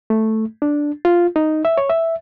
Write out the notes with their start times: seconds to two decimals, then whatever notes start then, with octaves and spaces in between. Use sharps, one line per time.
0.10 A3
0.62 D4
1.05 F4
1.36 D#4
1.65 E5
1.77 C#5
1.90 E5